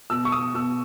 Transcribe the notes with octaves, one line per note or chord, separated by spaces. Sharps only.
B2 E6
C#6
D#6
B2 E6